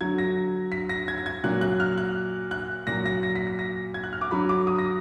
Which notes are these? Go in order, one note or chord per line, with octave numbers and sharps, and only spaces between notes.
D3 F#3 G#6
A#6
B6
A#6
G#6
A#6
G#6
A#2 F#3 F#6
F#6
F6
F#6
F#6
A#2 F#3 A#6
A#6
A#6
B6
A#6
A#6
G#6
F#6
F6
D6
D3 F#3 B5
D6
D#6
A#6